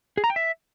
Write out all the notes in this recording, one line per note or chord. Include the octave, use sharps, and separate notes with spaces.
G#4
A#5
G5
E5